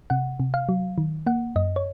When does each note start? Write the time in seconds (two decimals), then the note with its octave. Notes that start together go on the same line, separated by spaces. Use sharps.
0.10 C3 F#5
0.40 C3
0.54 F5
0.69 F#3
0.98 D#3
1.26 A#3 F#5
1.56 F#2 D#5
1.76 C#5